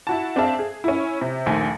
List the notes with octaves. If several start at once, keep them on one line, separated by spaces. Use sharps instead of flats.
E4 F#4 A5
C4 D4 G#4 E5 F5 A5
G#4
C#4 E4
C3
A#1 D#2 A3 G#5